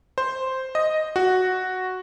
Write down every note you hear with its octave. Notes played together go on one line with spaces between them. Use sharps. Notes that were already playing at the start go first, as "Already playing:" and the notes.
C5
D#5
F#4